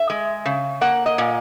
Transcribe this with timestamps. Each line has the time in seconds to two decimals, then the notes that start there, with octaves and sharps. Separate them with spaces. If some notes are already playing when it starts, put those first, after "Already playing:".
Already playing: E5
0.10 G#3
0.46 C#3
0.81 A#3 F#5
1.06 D#5
1.18 A#2